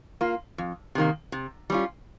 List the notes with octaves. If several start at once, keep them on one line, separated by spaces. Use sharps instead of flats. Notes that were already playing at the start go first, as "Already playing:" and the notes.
A#3 F4
F2
C3 D#3 A#3
C3
G3 C#4 F4